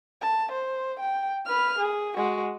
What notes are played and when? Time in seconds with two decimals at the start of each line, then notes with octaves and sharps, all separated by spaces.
0.22 A5
0.52 C5
1.00 G5
1.46 B4 F6
1.79 G#4
2.16 G#3 F#4